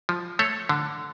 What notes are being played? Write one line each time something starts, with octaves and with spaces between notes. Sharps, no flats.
F3
A3 A4 C#5
D3